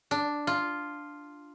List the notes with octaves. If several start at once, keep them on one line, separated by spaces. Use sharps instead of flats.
D4
F4